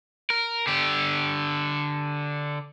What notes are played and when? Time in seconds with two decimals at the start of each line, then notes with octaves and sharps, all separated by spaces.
0.30 A#4
0.67 D3 G4